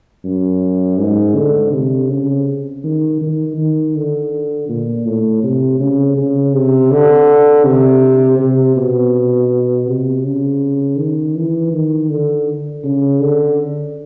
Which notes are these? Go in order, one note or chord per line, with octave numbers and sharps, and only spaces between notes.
F#2
G#2
D3
C3
C#3
D#3
D#3
D#3
D3
A#2
A2
C3
C#3
C#3
C3
D3
C3
C3
B2
C3
C#3
D#3
E3
D#3
D3
C#3
D3